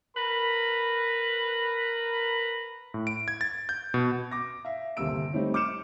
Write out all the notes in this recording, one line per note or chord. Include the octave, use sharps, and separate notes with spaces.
A#4 B4 A#5 B5
A2
D7
G#6
A6
G6
B2
D6 A#6
E5 F5
G1 D#2 C3 A#3 E6 D7
G3 A3 C4 D#4 C#5
D6 F6 G6 C#7 E7